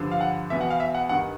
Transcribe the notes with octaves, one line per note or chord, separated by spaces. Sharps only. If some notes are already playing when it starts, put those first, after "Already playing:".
Already playing: G2 D3 F3
F5
F#5
E2 B2 E5
F#5
F5
E5
F#5
G2 D#3 F#5